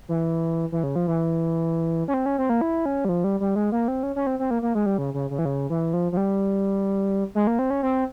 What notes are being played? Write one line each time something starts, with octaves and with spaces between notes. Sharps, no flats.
E3
E3
C#3
F3
E3
C#4
C4
C#4
C4
A#3
E4
C#4
G3
F3
G3
G3
G#3
A#3
C4
C#4
C#4
C4
C4
A#3
A#3
G#3
G3
C#3
C#3
C#3
E3
C#3
E3
F3
F3
G3
G#3
A#3
C4
C#4
C4